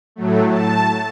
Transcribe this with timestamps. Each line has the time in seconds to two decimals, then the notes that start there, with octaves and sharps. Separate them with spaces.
0.16 A2 F#3 A3
0.50 A5